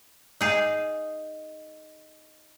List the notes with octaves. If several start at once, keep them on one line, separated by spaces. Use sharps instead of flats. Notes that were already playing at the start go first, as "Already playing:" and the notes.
D#4 G#4 F5